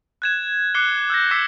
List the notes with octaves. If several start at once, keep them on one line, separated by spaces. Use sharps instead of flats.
F#6 G#6 E7
D6 F#6 C7 C#7 G7
E6 G6 A#6
D6 E6 F#6 B6 C7 E7